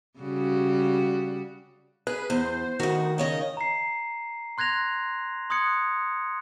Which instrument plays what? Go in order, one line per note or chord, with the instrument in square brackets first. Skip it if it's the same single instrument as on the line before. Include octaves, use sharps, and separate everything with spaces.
[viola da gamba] C#3 G3 F#4
[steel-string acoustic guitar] G#4 [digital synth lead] B4
[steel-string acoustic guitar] E2 [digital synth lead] C5
[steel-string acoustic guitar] D2 F#4 [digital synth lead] D#3
[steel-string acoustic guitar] C#3 C#5 D#5
[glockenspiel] A#5 C7
C6 F#6 G#6 A#6 F7
C6 D#6 F#6 G#6 C#7